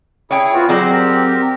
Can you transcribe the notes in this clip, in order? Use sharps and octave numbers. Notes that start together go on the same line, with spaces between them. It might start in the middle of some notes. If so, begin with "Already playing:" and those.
E4 G#4 C#5 G5
B3 C4 F4 F#4
F#3 C4 G#4 C5 D5 A#5
G4 A#4